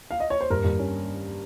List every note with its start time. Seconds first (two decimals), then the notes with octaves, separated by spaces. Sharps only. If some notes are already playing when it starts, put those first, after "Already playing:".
0.11 F5
0.20 D#5
0.30 C#5
0.41 C5
0.50 G2 A#4
0.64 G2
0.79 C#4